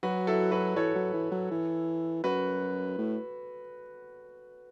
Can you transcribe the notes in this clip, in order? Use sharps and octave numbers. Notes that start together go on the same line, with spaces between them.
F#3 F#4 B4
E4 A4
F#4 B4
E3 A4 C#5
F#3
E3
F#3
E3
F#2 F#4 B4
A2